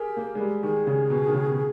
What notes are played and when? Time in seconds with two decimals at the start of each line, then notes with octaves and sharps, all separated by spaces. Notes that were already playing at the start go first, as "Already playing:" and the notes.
Already playing: G4 G#4 A#4
0.17 A#3
0.35 G#3
0.40 G3
0.63 D#3 G#4
0.87 C#3
1.10 B2
1.27 D#3
1.34 C#3
1.51 B2